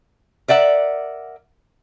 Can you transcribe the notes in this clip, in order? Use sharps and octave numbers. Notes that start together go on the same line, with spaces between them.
A#4 D5 E5 F#5